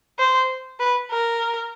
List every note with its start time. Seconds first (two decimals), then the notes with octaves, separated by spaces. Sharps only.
0.19 C5
0.80 B4
1.11 A#4